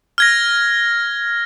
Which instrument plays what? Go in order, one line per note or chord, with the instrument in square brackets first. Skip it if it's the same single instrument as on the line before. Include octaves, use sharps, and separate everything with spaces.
[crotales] F6 G#6 A#6